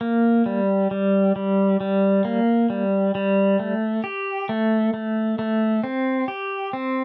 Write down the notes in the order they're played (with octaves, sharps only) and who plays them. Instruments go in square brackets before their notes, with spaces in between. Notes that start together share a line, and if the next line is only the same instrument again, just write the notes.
[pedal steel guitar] A#3
G3
G3
G3
G3
A#3
G3
G3
A3
G4
A3
A3
A3
C4
G4
C4